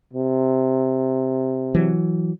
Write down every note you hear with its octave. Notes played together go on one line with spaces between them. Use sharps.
C3
E3 F#3